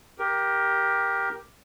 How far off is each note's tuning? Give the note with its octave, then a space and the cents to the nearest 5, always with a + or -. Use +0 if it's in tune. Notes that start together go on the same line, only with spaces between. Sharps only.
G4 +0 A#4 +15